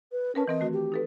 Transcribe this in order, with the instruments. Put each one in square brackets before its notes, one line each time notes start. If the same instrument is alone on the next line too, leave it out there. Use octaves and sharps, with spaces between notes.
[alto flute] B4
[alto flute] C#4 [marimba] A#4 B4 A5
[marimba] E3 C4 A#4 [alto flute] D#5
[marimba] D#3 A3 F#4
[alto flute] G4
[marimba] D#4 A4 B4